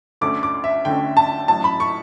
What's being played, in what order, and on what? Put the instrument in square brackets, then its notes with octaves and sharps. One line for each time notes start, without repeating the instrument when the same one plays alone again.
[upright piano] D2 D3 A3 C#4 D6
D6
E5
D2 D3 A3 C#4 G5
A5
A1 A2 F#3 A5
B5
C#6